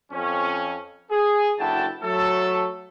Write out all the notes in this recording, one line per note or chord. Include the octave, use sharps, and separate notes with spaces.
F2 C#4
G#4
F#1 D3 E4 F#4 G5 A5
F#3 A3 A4